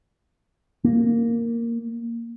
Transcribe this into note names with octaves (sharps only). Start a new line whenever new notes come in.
A#3